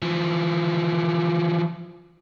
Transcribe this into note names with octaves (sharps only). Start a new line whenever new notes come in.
E3 F3